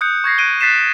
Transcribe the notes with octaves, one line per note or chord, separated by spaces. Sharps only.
D#6 F#6 G6 C#7
C#6 G#6 A#6 C7
F#6 D7 D#7 G7
F#6 A6 B6 C7 E7